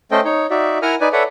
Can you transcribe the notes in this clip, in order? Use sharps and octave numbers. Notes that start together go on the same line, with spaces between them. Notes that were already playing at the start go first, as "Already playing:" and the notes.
A3 C#4 A4 C5 D#5 G5
D#4 C#5
D#4 F#4 D5 E5
E4 A#4 F#5 G#5 A#5 F6
D#4 B4 D5 G#5
A4 B4 C#5 D5 E5 F#5